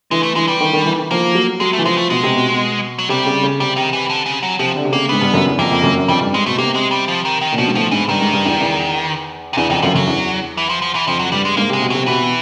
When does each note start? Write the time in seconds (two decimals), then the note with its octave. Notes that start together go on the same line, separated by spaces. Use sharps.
0.11 E3 G#3
0.23 A3
0.36 E3 G#3
0.48 G3
0.61 D#3
0.73 D#3
0.85 E3
0.98 D#3
1.11 F3 A#3
1.35 F#3
1.60 F#3 G#3
1.73 A3
1.78 E3
1.85 F3 G#3
1.98 A3
2.10 B2 G#3
2.23 C3
2.36 B2
2.99 F#3
3.09 C3 G3
3.26 C#3
3.43 C#3
3.60 C3 G3
3.76 D#3
3.93 E3
4.09 D3
4.26 C#3
4.43 F#3
4.59 C3 F3
4.76 D3
4.85 C3
4.92 C#3 A#3
5.09 G#2 B3
5.22 G2
5.34 F#2
5.46 E2
5.58 F2 A#3
5.71 F2
5.83 F#2
5.96 F#2
6.08 F2 G3
6.21 G2
6.34 G#2 G#3
6.46 B2 A3
6.58 C3 A#3
6.75 G#3
6.91 G3
7.08 F3
7.25 D#3
7.41 D#3
7.52 A#2
7.58 B2 F3
7.67 G#2
7.75 A2 F3
7.91 G#2 E3
8.08 G2 D#3
8.21 G#2
8.33 G2
8.46 E2
8.61 E2
9.53 C3
9.57 E2 C#3
9.69 F2 D#3
9.82 F#2 F3
9.95 F#2 F#3
10.07 E2
10.57 E3
10.69 F3
10.82 F3
10.95 E3
11.07 F2 F3
11.19 F#3
11.32 G2 G3
11.45 G#3
11.57 G#2 A#3
11.70 C3 G#3
11.82 B2
11.90 C3 F#3
12.07 B2 E3